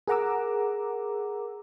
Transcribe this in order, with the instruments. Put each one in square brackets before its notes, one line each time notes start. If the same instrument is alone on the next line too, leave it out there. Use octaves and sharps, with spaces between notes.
[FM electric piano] G#4 A#4 F#5 A#5 D6 E6